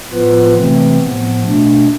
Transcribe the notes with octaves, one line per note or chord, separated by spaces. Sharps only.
A2 F3 B3 F4 B4
C3 E3 A3 C4
A2 F3 B3
B2 A3 D4